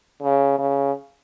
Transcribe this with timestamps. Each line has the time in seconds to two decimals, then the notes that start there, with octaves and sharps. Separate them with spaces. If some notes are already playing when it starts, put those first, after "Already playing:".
0.23 C#3
0.59 C#3